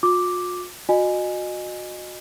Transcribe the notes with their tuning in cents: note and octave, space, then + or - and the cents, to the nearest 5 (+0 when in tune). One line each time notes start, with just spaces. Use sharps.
F4 +45 D6 +0
F#4 -25 D#5 -25 G#5 +0